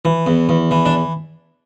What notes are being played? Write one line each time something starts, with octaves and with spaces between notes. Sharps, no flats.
E3
E2
E2
E3
D4